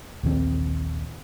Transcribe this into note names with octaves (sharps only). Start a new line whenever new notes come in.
A#1 D#2 D#3 C4